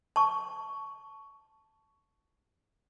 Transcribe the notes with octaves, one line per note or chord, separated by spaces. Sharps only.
A5 C#6